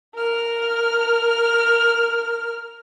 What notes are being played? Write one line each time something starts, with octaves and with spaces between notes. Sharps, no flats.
A#4 F6